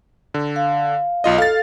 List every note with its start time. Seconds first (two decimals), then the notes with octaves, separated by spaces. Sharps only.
0.34 D3
0.56 F5
1.24 B1 F4 D#5
1.38 A4 F5 A6